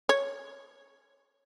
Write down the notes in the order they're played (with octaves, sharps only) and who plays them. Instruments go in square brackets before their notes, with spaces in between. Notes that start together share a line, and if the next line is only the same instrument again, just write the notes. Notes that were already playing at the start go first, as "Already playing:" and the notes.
[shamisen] C#5